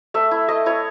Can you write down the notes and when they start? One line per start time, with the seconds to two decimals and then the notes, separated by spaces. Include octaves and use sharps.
0.14 A3 E5
0.31 E4
0.48 A3 D#5
0.66 E4 C#5